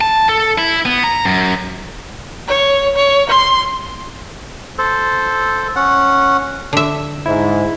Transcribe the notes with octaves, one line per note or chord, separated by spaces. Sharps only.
A5
A4
E4
B3
A#5
F#2
C#5
C#5
C6
A4 C5
C#4 F#5
D3 E5
G#2 E4